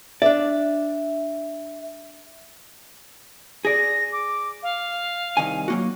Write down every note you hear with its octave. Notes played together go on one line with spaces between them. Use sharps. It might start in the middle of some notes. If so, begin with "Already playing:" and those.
D4 D5 E5
G#4 D5 A#6
D6
F5
C2 D#3 G#5
F#3 A#3 F#4